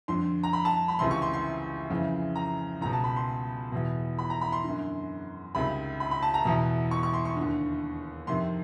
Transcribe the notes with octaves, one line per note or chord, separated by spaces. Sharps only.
F2 D3 C6
A#5
B5
A5
B5
C#2 C3 E3 C6
C#6
C6
C6
F2 C#3 E3
A#5
C#2 B2 A#5
A5
B5
C6
E2 B2
B5
A#5
B5
C6
F#2 D3
C#2 C3 D#3 B5
B5
B5
A5
A#5
E2 B2
C#6
C#6
C6
C#6
D3
D#2
F2 C3 D#3 C6